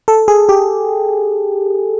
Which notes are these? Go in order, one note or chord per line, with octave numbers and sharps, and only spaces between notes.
A4
G#4
G4